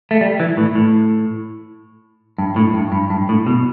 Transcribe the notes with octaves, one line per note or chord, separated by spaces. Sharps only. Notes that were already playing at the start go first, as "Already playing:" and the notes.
A3
G3
E3
A2
A2
G2
A2
G2
G2
G2
A2
B2